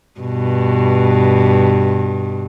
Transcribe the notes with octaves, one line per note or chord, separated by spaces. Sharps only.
G2 B2